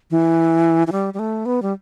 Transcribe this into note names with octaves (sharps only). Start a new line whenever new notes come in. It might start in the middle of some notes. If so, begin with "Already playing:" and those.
E3
E3
G3
G3
A3
B3
G3